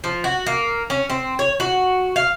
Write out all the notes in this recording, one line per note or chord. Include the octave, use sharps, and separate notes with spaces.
F3
F#4
A#3
C#4
C4
C#5
F#4
F5